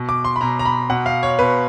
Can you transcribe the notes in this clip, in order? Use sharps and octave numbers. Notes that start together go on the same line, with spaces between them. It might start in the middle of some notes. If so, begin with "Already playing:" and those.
Already playing: B2
D6
C6
B5
B2 A#5
A#5
B5
B2 F#5
F5
C#5
B2 B4